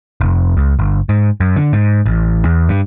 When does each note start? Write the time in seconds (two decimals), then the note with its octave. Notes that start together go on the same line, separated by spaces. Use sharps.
0.21 F1
0.57 C#2
0.79 G1
1.09 G#2
1.40 F#2
1.56 D3
1.73 G#2
2.06 A1
2.45 E2
2.69 G2